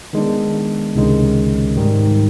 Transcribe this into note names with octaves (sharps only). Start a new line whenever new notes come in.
D#3 G#3 B3 D4
C#2 C3 D#3 G#3 C#4
G#2 D#3 G3